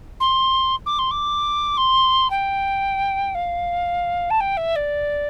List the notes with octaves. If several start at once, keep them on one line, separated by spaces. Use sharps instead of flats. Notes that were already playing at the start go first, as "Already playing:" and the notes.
C6
D6
C6
D6
C6
G5
F5
A5
G5
E5
D5